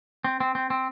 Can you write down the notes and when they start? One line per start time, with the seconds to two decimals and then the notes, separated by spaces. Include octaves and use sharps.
0.24 C4
0.40 C4
0.55 C4
0.70 C4